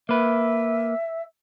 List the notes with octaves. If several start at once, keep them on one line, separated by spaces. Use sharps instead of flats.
A#3 B4 E5